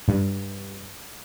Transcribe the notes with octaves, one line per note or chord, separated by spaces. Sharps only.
G2